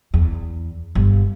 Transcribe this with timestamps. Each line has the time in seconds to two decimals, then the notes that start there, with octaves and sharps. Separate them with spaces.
0.14 E2
0.95 G1